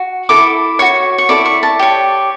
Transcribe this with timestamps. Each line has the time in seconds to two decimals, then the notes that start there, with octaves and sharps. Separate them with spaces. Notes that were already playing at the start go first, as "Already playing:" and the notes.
Already playing: F#4
0.29 E4 A4 D6
0.79 F#4 C#5 C#6
1.18 C#6
1.29 E4 A4 D5 D6
1.46 C#6
1.63 A5
1.79 G4 C#5